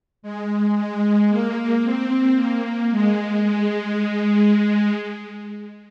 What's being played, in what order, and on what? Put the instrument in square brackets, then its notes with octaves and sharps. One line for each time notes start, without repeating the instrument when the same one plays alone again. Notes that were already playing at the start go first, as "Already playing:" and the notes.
[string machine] G#3
G#3
A#3
C4
A#3
G#3
G#3